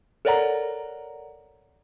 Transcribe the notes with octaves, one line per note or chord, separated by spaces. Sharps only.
A4 A#4 C#5 D5 F#5 A#5